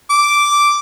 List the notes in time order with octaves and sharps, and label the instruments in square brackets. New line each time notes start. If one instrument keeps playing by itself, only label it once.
[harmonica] D6